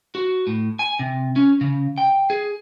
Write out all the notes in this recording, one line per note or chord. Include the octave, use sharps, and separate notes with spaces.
F#4
A2
G#5
C3
C#4
C#3
G5
G#4